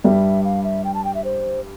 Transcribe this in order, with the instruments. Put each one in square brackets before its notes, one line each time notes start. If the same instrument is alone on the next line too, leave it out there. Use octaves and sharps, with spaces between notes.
[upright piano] G2 G3 [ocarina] E5
[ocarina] F5
E5
G5
A5
G5
E5
C5